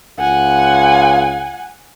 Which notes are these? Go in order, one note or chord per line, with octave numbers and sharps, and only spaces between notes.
C#2 F#5 G#5